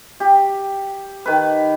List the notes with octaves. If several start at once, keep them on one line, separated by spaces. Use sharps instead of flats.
G4
D#3 B4